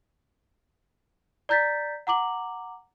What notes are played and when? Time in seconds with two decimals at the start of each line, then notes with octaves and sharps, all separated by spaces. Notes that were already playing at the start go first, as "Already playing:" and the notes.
1.49 D5 A#5 G6 A6 B6
2.07 F#5 A#5 D6 F#7